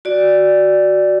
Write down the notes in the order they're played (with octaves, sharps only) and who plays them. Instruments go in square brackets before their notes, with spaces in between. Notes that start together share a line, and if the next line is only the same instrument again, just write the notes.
[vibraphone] F#4 D5